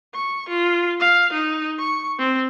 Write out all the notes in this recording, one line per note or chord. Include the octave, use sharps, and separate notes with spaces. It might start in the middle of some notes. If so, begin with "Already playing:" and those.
C#6
F4
F5
D#4
C#6
C4